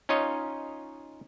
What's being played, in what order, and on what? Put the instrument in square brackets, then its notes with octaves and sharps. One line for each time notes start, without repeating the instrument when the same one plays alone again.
[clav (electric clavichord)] C#4 D#4 F4 C#5 D#5